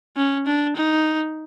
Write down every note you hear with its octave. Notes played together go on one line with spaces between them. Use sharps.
C#4
D4
D#4